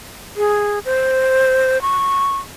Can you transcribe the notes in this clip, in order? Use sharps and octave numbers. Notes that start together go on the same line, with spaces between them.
G#4
C5
C#6